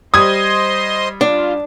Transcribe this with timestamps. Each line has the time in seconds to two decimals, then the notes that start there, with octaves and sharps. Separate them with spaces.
0.14 G3 C5 D#5 C6 D#6 G#6
1.21 D4 F4